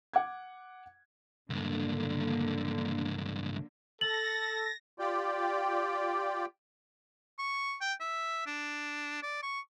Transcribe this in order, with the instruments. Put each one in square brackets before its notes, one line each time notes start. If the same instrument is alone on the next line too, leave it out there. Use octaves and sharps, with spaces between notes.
[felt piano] F#5 D6 G#6
[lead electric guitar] C#2 G2 [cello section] D3 A#3
[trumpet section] A4 [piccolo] A6 [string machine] A#6 [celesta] F#7
[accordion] F4 G4 D5 G5
[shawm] C#6
G5
E5
D4
D5
C#6